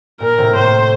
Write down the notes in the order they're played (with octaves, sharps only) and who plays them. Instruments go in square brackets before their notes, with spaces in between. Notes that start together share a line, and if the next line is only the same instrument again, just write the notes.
[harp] A#2 [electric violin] A#4
[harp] A2 C3
[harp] A2 [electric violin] C5